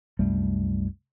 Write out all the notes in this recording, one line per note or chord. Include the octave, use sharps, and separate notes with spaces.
C2 F#2 G3 A3